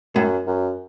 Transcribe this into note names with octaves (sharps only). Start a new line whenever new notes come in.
F#2 A2
F#2